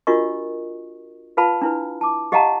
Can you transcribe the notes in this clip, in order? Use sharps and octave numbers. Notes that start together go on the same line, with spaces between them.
D4 F4 F#4 A#4 D#5 C#6
F4 B4 F5 A5 B5
D4 E4 B4
A5 D6
G4 D#5 F5 F#5 A5 A#5